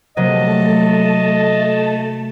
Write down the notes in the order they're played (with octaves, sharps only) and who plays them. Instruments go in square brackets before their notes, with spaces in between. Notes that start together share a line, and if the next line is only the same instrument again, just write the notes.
[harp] C3 F#3 A#3 [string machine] A3 A5 [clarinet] D#5